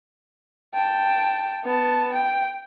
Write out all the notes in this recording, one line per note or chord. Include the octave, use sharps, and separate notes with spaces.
G5 A5
B3 A5
G5